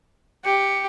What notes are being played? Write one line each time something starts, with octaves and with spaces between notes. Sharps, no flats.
G4 C#7